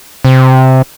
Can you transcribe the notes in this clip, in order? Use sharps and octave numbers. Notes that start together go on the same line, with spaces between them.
C3